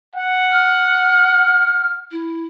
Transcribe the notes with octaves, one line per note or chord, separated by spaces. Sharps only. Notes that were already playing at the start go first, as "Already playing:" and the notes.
F#5
F6
E4